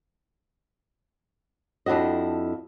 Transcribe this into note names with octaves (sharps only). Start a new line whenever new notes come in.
F2 D4 E4 F#4 D#5